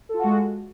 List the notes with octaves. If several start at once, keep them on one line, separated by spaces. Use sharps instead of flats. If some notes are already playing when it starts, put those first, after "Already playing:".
G#3 F4 F#4 A4